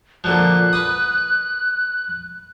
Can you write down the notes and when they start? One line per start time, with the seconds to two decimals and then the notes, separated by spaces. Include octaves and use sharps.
0.24 A#2 D3 F3 F#6
0.73 B4 D#6